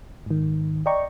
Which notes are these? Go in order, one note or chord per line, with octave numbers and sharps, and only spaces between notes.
G#2 D#3
D5 D#5 G5 A#5 C#6